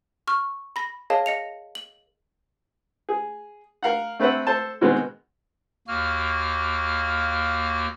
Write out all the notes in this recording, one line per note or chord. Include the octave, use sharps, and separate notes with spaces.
C#6 F6
B5 A#6
G#4 A#4 C#5 D#5 F5 A5
D#5 C#7 F7
F#7
G#4
A#4 F5 F#5
A3 C4 B4 E5 F#5
A4 C5 A5
B2 D#3 G#3 B3 C4
D#2 A#3 F#4 F6